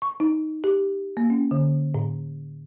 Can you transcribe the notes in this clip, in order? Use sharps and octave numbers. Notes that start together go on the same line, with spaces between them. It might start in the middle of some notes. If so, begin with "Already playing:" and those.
C#6
D#4
G4
A#3
C#4
D3
A2